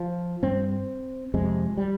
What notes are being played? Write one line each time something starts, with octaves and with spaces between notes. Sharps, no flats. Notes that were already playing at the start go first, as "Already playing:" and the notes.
Already playing: F3
G2 C4
F2 C3 G#3
G3